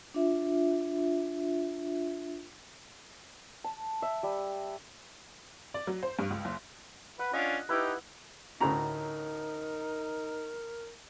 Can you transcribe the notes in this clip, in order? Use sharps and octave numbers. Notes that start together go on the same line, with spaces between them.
D4 F4 E5
A5
E5
G3
D5
F#3
C5
G2
C#2
F#1
B4 F#5
C#4 D4 F4 D#5
D#4 E4 G4 B4
D2 A2 C#4 D#4 F#4 A#4 A#5